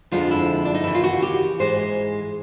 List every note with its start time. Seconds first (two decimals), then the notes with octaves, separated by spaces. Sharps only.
0.11 F2 D3 F3 G#3 F4
0.31 E4
0.65 D4
0.74 D#4
0.84 D#2 C#3 E3 E4
0.95 F4
1.04 F#4
1.22 G4
1.59 G#2 E3 G#3 C5